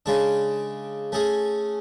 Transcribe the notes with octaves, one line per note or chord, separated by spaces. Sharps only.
C#3 G#3 D4
A3 C#4 G#4